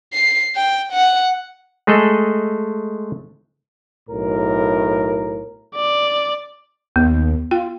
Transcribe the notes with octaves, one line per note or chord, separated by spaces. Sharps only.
C7
G5
F#5
G#3 A3 G#4 A4 D#5
B1 A2 A#4
D5
D#2 B3
F4 G5